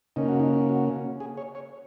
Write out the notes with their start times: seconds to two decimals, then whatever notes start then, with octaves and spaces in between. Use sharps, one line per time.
0.16 C#3 A#3 C#4 D#4
0.28 F#4
0.40 D#4
0.69 F#4
1.20 G#4
1.37 C#5
1.55 C#5